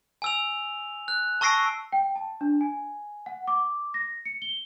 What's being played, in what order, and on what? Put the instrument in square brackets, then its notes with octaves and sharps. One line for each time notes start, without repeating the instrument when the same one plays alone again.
[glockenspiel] G#5 E6 F7
F#6
A5 C#6 E6 A#6 C7 D7
[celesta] G5
A5
D4
G#5
F#5
D6
A#6
C#7
G7